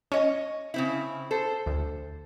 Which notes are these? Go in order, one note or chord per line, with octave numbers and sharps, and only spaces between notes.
C#4 C#5 D#5
C#3 C4 E4
A4 C5
D2